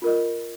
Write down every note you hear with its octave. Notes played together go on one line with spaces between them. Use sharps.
F4 A#4 D#5